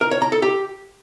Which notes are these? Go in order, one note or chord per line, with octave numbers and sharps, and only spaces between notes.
A#4
C#5
A#5
A4
G4